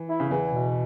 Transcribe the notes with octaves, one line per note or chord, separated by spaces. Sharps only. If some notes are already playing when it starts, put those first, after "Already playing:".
Already playing: E3
E4
C#3
E2 E3
B2